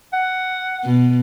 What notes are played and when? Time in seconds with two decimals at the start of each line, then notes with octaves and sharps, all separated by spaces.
0.13 F#5
0.84 B2